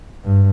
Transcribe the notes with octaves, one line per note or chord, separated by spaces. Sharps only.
G2